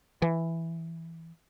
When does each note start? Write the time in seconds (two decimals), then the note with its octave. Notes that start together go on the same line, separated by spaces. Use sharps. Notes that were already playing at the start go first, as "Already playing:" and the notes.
0.22 E3